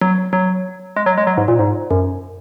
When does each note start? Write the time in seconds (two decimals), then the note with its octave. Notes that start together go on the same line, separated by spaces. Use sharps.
0.01 F#3
0.33 F#3
0.97 G#3
1.06 F#3
1.18 G#3
1.27 F#3
1.37 G#2
1.48 A#2
1.59 G#2
1.91 F#2